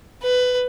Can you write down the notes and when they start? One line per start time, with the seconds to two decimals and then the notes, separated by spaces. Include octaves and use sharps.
0.23 B4